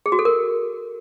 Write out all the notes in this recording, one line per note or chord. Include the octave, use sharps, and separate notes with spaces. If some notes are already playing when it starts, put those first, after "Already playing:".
G#4
F#4
A4
A#4